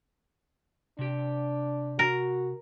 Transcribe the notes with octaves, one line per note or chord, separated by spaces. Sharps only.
C3 D4 G4
F#4 A#4